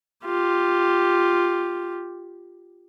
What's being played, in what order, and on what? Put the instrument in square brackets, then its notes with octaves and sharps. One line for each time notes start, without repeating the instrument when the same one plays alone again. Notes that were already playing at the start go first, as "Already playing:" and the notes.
[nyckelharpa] F4 G4